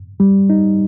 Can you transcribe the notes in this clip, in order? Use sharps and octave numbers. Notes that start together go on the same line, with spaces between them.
G3
D#4